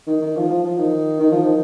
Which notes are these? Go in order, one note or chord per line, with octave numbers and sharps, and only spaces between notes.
D#3
D#3
F3
F3
F3
D#3
D#3
F3
D#3